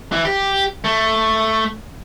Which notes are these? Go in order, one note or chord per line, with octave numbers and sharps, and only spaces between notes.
E3
G4
A3